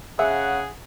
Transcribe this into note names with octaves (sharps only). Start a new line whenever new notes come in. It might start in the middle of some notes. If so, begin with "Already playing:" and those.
C#3 G#4 E5 F#5